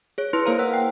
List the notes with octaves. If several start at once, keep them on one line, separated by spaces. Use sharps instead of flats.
G#4 C#5
E4 B4 C6
A#3 A#4 C5 F5 A#5
F#5 E6 F#6
G5